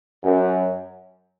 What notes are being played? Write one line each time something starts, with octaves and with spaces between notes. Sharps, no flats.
F#2